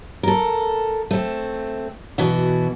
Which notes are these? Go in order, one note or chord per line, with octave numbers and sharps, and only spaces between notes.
A4 A#4
A3 C4
B2 E3 F#4